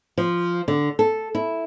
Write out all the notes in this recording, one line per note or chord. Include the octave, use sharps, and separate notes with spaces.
F3
D3
A4
E4